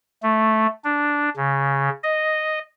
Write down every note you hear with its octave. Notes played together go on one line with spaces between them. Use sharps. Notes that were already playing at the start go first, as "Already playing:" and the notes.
A3
D4
C#3
D#5